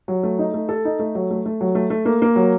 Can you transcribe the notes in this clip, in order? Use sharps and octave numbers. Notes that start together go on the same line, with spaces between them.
F#3
A3
D#4
A3
A4
D#4
A3
F#3
A3
A3
F#3
A3
A3
A#3
A#3
F#3